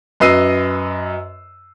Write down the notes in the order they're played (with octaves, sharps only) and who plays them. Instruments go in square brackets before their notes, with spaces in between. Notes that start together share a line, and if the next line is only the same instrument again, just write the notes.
[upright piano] F#2 B4 D#5 E6 C7 D#7